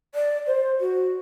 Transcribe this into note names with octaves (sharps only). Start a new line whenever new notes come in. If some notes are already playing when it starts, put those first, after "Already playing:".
D5
C5
F#4